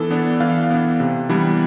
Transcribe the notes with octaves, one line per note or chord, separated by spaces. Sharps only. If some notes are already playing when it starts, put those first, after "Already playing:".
Already playing: E3 B3 D4 A4
B3 D4
E3 F5
B3 D4
C3
E3 G3 B3 D4